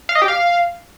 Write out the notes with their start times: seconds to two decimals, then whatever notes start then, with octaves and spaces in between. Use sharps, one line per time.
0.09 F5
0.15 D#5
0.22 G4
0.28 F5